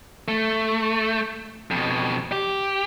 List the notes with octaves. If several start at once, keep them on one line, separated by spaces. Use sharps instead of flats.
A3
F2 B2
G4